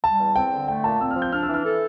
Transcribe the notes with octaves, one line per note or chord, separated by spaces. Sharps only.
G3 A5
E2
C4 G5
D3
A3 G5
A#2 A5
C4 E6
F6
F3
G6
D4 F6
E6
E3
F6
A4